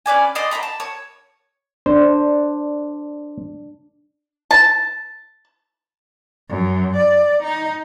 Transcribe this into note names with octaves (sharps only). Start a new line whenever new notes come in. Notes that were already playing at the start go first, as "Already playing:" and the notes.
C#4 B4 D5 G#5
D5 D#5 C6
C#5 E5 A#5 B5
A5
C#5
D4 C5
A5
F#2
D5
D#4